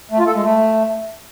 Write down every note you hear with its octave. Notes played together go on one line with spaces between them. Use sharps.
A3
F4
A4
G#3
A3